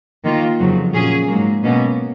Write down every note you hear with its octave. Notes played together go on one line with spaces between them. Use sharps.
D#3 A#3 F4
F2 C#3 F#3
A#2 F#3 C#4 G#4
G#2 F#3 A#3
B2 A#3 C#4